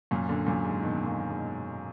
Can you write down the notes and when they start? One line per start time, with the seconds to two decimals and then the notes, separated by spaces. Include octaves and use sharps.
0.11 F#2 A#2
0.29 A#2 D3
0.47 F#2 A#2
0.65 G#2
0.82 B2 D#3
1.06 A#2 D3
1.30 G#2 B2